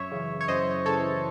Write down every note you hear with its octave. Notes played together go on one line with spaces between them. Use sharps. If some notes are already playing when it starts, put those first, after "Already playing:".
Already playing: F#2 C#5 E5
C#3 E3
C#5
F#2 C5 D#5
C#3 E3 A4 C#5